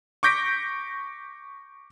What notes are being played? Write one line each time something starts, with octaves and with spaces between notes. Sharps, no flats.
C#6 D6 G6 A#6 B6 D7